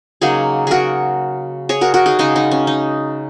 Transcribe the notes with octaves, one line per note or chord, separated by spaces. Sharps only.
C#3 F#3 A#3 D#4 G#4
F#4 G#4 A#4
G#4 C#5
F#4 A#4
F#4 A#4
D#4 G#4
C#3 G#3 D#4 G#4
D#4
C#4
D#4